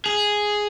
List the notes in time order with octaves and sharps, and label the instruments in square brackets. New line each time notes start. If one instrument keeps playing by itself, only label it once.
[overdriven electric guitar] G#4